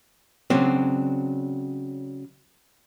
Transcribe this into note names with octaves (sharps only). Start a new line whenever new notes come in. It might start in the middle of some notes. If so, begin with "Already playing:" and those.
C#3 F#3 C4 D4